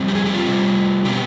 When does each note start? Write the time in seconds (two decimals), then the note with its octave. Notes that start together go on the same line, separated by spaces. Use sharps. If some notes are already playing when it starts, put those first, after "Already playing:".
Already playing: F2 G3 C4
0.08 G4
0.15 G#4
0.25 G4
0.35 F4
0.45 C3 G3 C4
1.05 B2 B3 G4